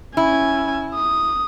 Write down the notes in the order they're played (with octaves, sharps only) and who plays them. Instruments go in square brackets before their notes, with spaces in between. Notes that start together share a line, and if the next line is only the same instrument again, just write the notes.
[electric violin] C#4 G#5 [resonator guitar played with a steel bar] E4
[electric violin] D#6